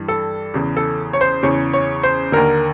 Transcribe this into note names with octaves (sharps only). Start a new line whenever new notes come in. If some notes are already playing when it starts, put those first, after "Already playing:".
Already playing: G2 E3
A4
E2 C#3 E3
A4
C#5
C5
E2 C#3 E3 C#5
C#5
C5
D#2 D3 A#4